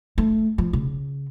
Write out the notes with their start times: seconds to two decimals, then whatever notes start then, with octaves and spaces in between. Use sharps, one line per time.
0.18 A3
0.58 F3
0.73 C#3